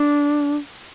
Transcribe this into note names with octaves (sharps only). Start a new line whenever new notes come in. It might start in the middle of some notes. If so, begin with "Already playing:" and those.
Already playing: D4